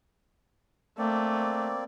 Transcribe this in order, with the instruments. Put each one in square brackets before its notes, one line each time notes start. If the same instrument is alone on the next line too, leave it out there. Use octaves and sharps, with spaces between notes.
[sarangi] A3 [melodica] A#3 C4 D5